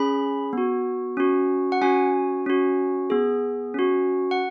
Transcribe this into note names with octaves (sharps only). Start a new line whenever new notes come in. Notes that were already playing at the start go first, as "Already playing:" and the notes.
Already playing: C#4 G#4 B5
B3 F#4
C#4 F#4
F#5
C#4 F#4 G#5
C#4 F#4
B3 G#4
C#4 F#4
F#5